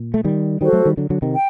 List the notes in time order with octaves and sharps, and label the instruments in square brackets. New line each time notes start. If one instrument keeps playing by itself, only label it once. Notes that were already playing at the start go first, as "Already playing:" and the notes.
Already playing: [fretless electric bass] A#2
A3
D#3 G3
[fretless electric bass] D#3 G3 [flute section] F#4 A4 C5
[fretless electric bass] F#3 A3
D#3 G3
D3 F#3
D3 F#3
C3 D#3
[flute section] G5